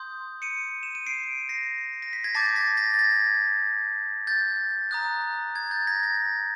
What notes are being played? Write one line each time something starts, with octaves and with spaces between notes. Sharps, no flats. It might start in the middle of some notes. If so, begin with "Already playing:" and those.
Already playing: C6 D#6 G6
C#7 D#7
E7
D#7
C7 D7
A#6 C7
A#6
B6
G#6 A#6
A5 D6 G6 A6 B6
A#6
A6 B6
G#6 A#6
A6
G#6 A#6
G6 A6
A#5 D#6 F#6
G#6
G6 A6
G#6 A#6
G#6 A#6